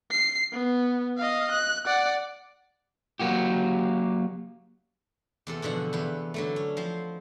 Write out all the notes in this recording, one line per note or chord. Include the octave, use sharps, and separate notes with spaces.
C7
B3
D#5 F5
F#6
D5 F#5
F#3 A#3 F#4 G4
E2 C3 A4
E2 B2 D3 F3 F#5
E2 C3 B4
D3 F#3 A3
C#4
F3 C4 C5